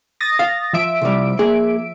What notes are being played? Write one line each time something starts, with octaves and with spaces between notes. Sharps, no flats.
D#6 A6 A#6
F5
F3 E5 D7
C2 G3
A#3 G#4